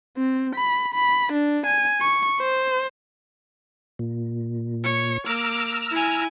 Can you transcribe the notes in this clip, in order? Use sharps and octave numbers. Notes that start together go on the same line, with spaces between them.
C4
B5
B5
D4
G#5
C#6
C5
A#2
C#5 C#7
A#3 A#5 D6 E6 F6
E4 G#5